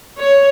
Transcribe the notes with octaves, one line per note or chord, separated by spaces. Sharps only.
C#5